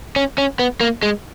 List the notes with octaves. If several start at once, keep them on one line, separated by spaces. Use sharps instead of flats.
C#4
C#4
B3
A#3
G#3